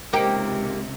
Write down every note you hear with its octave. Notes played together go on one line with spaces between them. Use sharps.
C#2 C3 A#3 D#4 G4